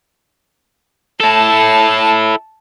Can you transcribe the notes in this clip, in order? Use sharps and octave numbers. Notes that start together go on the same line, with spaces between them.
E4 A4 A5